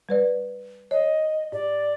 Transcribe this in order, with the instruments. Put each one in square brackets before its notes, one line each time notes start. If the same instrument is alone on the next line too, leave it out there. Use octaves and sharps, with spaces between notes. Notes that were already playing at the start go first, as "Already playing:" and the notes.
[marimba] G3 B4 D5
[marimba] C#5 [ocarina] D#5
[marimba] G#2 [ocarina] D5